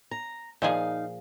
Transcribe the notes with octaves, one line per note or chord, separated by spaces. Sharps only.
A#5
A#2 F3 D#4 G#4 F5